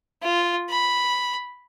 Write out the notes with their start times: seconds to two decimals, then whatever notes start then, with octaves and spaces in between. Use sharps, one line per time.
0.23 F4
0.70 B5